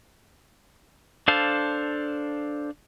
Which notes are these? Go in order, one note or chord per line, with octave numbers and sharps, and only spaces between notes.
D4 A4 C5 F5 A5